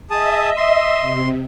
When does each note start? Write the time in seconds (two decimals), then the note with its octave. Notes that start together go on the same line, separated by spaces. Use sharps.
0.10 G#4 D#5 E5 A5 D#6
0.57 C6
1.01 C3